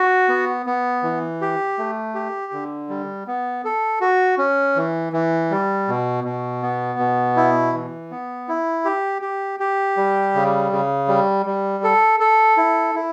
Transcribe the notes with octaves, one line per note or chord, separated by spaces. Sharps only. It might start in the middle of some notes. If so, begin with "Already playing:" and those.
Already playing: F#4
B3
B3
E3
G4
A3
G4
D3
G3
B3
A4
F#4
C#4
E3
E3
G3
B2
B2
B3
B2
E4
E3
B3
E4
G4
G4
G4
G3
C#3
C#3
G3
G3
A4
A4
E4
E4